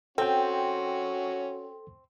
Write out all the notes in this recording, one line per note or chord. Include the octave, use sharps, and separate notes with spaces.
C4 C#4 F#4 A4 G5